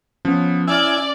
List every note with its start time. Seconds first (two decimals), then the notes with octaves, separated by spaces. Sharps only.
0.25 F3 B3 C#4
0.67 E4 D5 G#5 E6 F6